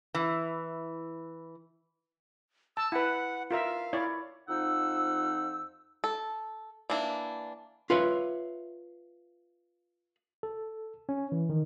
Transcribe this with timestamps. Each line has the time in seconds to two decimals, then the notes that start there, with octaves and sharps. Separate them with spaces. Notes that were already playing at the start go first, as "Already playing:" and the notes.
0.14 E3
2.77 A5 E6
2.92 E4 B4 F#5
3.51 F4 A#4 E5 F5
3.93 E4 C#5 D5
4.48 F2 F3 D#4 F#5 E6
6.04 A4
6.90 E3 A#3 D4 E4
7.90 F4 B4 C#5 E5
10.43 A4
11.09 C#4
11.32 E3
11.49 D#3